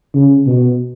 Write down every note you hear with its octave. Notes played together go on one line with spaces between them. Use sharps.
C#3
B2